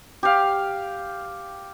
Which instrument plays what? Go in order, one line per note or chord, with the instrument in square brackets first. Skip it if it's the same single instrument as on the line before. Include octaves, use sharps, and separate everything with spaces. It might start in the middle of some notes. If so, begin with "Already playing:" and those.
[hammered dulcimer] G4 F5